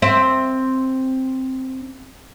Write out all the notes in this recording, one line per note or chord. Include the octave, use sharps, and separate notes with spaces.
C4 E5